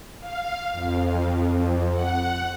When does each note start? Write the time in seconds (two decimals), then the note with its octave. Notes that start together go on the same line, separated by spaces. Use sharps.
0.19 F5
0.72 F2
1.91 F#5